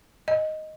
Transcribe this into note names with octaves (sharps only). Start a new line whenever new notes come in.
D#5